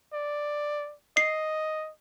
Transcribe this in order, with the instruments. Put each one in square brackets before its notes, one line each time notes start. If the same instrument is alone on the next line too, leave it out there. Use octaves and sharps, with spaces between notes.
[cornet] D5
[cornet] D#5 [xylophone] C7